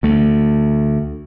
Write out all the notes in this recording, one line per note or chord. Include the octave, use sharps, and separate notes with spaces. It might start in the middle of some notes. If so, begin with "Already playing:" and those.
D2 A3